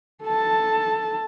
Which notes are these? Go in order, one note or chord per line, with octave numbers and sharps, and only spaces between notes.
A4 A5